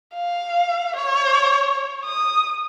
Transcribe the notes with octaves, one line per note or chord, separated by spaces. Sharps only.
F5
C#5
D#6